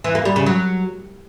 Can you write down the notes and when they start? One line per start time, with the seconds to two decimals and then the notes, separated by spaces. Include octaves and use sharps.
0.04 E3
0.15 A#3
0.25 G3
0.36 C#3
0.46 F#3